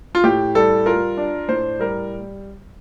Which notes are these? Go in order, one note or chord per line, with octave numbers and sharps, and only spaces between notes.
F4
A2 G4
G3 A4
F4 A#4
D4
A2 C5
G3 A#4